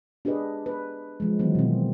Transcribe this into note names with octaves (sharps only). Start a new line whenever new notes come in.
D4 G4 G#4 B4 D#5
B4
F3 G#3
D#3 E3 F#3 B3
B2 C4